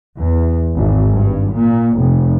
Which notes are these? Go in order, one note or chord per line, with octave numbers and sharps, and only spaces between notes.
E2
G#1
G2
A#2
F1